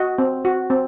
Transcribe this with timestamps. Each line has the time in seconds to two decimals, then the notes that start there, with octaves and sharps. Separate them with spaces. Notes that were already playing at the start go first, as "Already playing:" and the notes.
Already playing: F#4 D#5
0.18 C4
0.45 F#4
0.70 C4